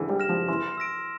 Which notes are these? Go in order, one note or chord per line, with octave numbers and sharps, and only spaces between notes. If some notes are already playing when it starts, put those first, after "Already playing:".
Already playing: D3 E3
G3
F6 A#6 E7
F3
E3 C6
E6 A#6 D7